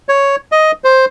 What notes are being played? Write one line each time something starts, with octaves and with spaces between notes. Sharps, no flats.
C#5
D#5
C5